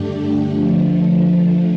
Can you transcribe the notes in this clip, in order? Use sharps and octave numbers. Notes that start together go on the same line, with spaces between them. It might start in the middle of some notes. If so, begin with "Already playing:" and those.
Already playing: G2 D3 A3 D4 G4
D3 F3 A3